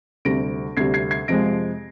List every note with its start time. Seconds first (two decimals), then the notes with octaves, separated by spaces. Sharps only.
0.25 D2 C3 G3 A#6 D7
0.77 D2 C3 G3 G#6 C7
0.94 G#6 C7
1.11 G#6 C7
1.28 F2 C3 F3 G#3 A#6 D7